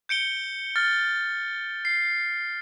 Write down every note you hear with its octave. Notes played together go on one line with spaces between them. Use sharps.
G6 C#7 D7 G7
F6 A6
C7